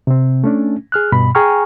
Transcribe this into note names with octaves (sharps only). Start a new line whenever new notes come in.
C3 C4
A3 C#4 D4
G#4 F6 F#6
G2 B2 B5
G#4 G5 G#5 A#5 C#6 F6